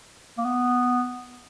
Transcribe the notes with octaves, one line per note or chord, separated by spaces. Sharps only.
A#3
B3